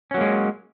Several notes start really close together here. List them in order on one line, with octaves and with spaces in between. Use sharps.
C#4 F#3 A#3 G#3